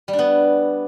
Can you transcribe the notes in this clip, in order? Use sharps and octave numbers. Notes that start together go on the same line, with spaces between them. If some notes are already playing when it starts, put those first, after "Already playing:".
G3
D4
B3